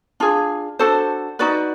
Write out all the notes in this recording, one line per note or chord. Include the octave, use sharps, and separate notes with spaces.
D4 F4 G#4
D4 F#4 A4 C5
D#4 F#4 B4 D5